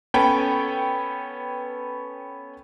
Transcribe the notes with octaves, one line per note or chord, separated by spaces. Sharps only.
B3 C#4 A4 B4 C#5 G5